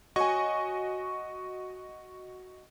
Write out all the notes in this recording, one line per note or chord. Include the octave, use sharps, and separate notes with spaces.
F#4 C#5 D#5 G#5 C#6